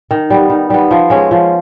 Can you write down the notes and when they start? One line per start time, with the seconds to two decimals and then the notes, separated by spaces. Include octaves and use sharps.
0.11 D#3
0.30 G3 B3
0.50 D#3
0.70 G3 B3
0.91 F3
1.10 G#3 C#4
1.31 F3